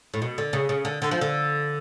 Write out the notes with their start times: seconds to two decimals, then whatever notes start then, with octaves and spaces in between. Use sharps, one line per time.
0.14 A2
0.22 B2
0.38 D3
0.53 C#3
0.69 C#3
0.85 D3
1.02 D3
1.11 F3
1.21 D3